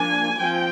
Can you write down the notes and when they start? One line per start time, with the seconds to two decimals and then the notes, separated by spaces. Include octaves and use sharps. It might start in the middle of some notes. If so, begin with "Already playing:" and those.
Already playing: F3 A#3 D4 G#5
0.38 F3 C4 G5